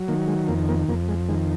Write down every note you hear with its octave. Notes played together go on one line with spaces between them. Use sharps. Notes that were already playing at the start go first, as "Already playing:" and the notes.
Already playing: F#3
D#3 A#3
G#3
F2 A#3
A#3
F2 A#3
G#3
D#3 G#3